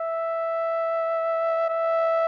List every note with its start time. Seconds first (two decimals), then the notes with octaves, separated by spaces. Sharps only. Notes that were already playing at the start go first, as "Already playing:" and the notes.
Already playing: E5
1.69 E5